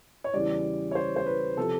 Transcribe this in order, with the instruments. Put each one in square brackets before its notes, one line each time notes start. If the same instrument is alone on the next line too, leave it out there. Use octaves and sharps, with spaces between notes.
[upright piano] C#5
E2 C#3 E3 G3 D5
C#5
C5
C5
B4
C3 F3 A4